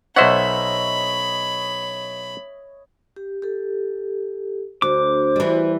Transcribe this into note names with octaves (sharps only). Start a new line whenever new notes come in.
B1 C5 C#5 D#5 E5 F#5 B5
G4
G4 A4
D2 F#4 C5 D6
E3 G3